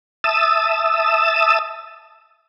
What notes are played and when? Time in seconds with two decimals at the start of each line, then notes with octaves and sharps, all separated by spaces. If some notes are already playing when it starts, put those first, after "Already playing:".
0.24 E5 A5 D#6 E6